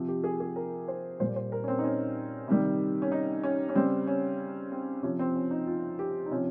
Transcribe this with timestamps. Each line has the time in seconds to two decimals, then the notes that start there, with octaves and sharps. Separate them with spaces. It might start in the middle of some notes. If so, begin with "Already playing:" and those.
Already playing: C3 F3
0.08 G4
0.24 G#4
0.40 G#4
0.56 A#4
0.88 C5
1.20 A#2 G3 C5
1.36 C5
1.52 A#4
1.64 C#4
1.68 C4
1.79 D#4
1.84 C#4
2.48 C3 D#3 G3
3.02 C#4
3.12 D#4
3.44 C#4
3.69 C#4
3.75 C#3 G3 C4
4.07 C#4
4.72 C4
5.03 C3 F3 C#4
5.19 C4
5.36 C#4
5.51 D#4
5.67 F4
5.99 G4
6.26 D#4
6.31 C3 F3 C#4